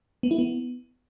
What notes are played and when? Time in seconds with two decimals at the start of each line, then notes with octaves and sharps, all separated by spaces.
0.23 B3
0.31 E4
0.38 B3